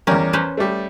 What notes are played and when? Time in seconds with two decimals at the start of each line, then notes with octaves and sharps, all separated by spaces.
0.07 E2 G3 C#4 A#4
0.33 C#4 B4 C5
0.57 G3 A3